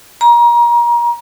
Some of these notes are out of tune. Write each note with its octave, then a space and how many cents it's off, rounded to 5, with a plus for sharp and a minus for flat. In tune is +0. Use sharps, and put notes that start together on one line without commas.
A#5 +30